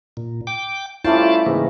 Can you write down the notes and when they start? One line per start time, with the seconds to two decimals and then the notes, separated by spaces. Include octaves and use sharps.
0.17 A#2
0.47 G5 D6
1.05 G3 A3 C#4 E4 F4 C5 D5 A5
1.46 G#2 C#3 E3 A#3